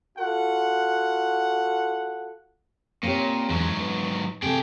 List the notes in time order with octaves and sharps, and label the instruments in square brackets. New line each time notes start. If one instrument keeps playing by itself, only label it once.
[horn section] F4 F#4 A4 F#5
[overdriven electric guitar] A#2 [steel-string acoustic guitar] C4 G4 C#5
[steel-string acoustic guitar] E2 [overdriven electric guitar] G#2 F#3
[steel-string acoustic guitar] B3
[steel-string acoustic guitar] C3 A4 [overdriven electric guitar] G#4 G5